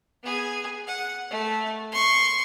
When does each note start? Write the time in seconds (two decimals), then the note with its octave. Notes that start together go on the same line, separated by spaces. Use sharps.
0.23 B3 G#4
0.87 F#5
1.31 A3
1.92 C6 C#6